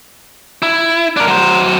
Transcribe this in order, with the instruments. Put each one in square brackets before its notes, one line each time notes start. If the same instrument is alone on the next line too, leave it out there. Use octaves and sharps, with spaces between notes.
[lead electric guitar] E4
D4 A#4
F#3 C5